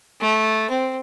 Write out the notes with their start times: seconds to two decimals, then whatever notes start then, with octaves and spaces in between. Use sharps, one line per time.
0.21 A3
0.70 C4